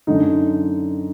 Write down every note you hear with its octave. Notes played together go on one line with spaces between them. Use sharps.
F#2 D3 D#4